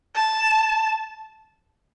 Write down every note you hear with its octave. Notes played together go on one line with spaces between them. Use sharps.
A5